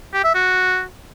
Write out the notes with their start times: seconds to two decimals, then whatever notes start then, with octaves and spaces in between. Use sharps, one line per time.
0.14 G4
0.24 E5
0.35 F#4